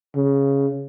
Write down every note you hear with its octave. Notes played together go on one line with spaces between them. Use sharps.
C#3